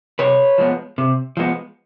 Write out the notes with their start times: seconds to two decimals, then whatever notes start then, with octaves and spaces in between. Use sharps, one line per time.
0.19 C3 B4 C#5
0.58 F3 G#3 B3
0.98 C3
1.37 F3 G#3 B3